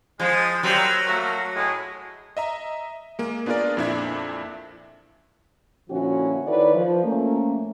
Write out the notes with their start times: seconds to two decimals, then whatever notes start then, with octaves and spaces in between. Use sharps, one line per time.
0.20 F3 G#3
0.63 F#3 G3 A#3 C4
1.06 A3 A#3 F#4
1.55 A2 G#3
2.37 D#5 E5 A#5
3.19 G#3 A#3
3.46 B3 D4 F4 G#4 A#4 D5
3.77 F2 A#2 D4 E4 E5 G#6
5.90 A#2 D3 F3 C#4 E4 F#4
6.47 D#3 E4 A4 B4 C#5 D5
6.75 F3
7.04 A3 A#3 C#4